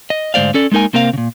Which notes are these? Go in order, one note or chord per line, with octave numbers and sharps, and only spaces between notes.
D#5
D2 G#2 G#3 C5 D5 F5
C#4 A4 D5
G#3 A#3 D#4 A#4 G#5
C3 A#3 C4 A#4 F5
A#2 C#3